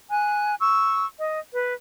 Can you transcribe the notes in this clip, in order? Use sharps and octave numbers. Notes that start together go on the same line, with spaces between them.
G#5 F#6
C#6 E6
D#5
B4